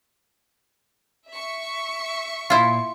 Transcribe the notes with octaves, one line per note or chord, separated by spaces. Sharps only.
E5 C#6
A#2 E4 F4 F5